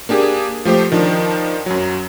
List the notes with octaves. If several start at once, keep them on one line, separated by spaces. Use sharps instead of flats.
A#3 D4 G4 G#4
F3 A3 G4 C5
D#3 F3 D4
F#2 F#3